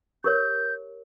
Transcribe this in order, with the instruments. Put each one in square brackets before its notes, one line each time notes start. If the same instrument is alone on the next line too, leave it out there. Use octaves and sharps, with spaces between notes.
[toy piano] G4 A#4 C#5 [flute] G6